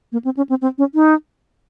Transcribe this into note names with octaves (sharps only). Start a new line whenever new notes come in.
A#3
C4
C#4
C4
C4
C#4
D#4